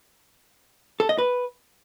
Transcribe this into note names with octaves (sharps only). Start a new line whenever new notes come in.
A4
D#5
B4